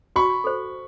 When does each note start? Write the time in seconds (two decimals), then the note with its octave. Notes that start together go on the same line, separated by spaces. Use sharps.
0.16 F#4 B5 C#6
0.44 A4 C5